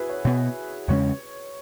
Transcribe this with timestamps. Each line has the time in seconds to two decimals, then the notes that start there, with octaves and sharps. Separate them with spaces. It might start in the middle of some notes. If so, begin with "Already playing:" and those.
Already playing: E4 F#4 G#4 B4
0.10 C#5
0.25 B2 B3 C#5
0.88 E2 C#3 G#3 C#4 C#5